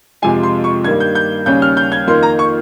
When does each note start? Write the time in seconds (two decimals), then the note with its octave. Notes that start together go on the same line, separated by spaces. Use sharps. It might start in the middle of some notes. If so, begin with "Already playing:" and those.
0.22 F2 C3 F3 G#3 G#5
0.43 C6
0.64 C#6
0.84 G2 D#3 G3 A#3 G#6
1.00 G6
1.15 G6
1.46 D#2 C#3 G3 C#4 G6
1.62 F6
1.77 G6
1.92 G#6
2.07 F2 D#3 A#3 C6
2.23 A#5
2.39 C#6